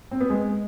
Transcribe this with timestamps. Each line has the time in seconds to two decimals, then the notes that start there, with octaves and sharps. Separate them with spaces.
0.11 C4
0.21 B3
0.30 G#3